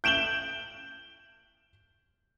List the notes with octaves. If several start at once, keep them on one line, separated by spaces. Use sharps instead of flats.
G6 D7 E7 F#7 G7